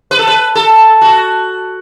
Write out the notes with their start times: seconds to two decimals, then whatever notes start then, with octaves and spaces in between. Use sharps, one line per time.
0.11 B4
0.19 A4
0.27 B4
0.55 A4
1.01 F#4